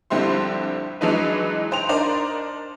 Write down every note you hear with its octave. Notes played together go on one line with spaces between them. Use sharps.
A#1 D3 G3 C4 E4 C6
E3 F#3 G#3 D4 D#4 B4
D#4 C5 G5 F7
D4 D#4 A#4 C5 D5